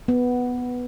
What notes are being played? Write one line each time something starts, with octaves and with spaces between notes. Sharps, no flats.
B3